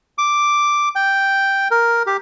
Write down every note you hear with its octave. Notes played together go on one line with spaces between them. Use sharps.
D6
G5
A#4
G4